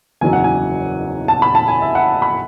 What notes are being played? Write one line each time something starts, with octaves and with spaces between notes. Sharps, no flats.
F#1 E2 D#3 F#3 G#5
F#5
G#5
A5
B5
A5
G#5
E5
F#5
B5